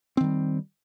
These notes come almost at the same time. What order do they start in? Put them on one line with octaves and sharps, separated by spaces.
C4 D#3 G3